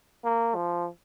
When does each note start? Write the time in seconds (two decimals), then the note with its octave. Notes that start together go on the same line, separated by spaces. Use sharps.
0.24 A#3
0.55 F3